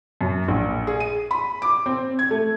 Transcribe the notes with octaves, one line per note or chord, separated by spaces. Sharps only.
F#2
A#1
G#4
D#7
B5
D6
C4
G#6
A3